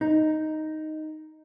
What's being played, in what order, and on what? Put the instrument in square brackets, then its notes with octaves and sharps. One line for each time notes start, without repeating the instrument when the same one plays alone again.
[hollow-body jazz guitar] D#4